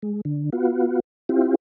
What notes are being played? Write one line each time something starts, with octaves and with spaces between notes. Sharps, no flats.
G#3
D3
B3 F4 F#4
C4 E4 F4 G4